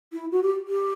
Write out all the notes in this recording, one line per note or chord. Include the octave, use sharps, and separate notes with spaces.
E4
F#4
G4
G4